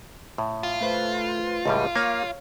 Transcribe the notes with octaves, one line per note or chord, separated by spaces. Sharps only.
A2
F4
A3 B4 C5
C#2 A2 G3
A#3 C#5 F5